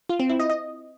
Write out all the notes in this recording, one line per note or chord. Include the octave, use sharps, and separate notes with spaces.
F4
C4
E4
D#5
D#5